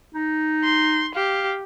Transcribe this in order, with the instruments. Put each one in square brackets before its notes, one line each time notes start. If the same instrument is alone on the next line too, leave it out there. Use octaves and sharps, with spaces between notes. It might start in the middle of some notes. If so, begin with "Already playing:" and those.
[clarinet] D#4
[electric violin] C6
[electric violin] G4 [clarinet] F5